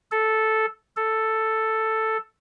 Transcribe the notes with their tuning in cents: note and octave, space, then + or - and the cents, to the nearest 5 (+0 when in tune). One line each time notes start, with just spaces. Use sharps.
A4 -5
A4 +5